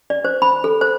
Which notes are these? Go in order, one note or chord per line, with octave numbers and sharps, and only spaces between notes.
D5
C5
B5
A4
C5